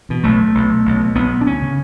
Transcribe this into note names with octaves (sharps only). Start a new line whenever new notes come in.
E2 B2
B1 A3
B2
B1
B2
B1
B2
B1 B3
B2
D4
D2 C#4
C#3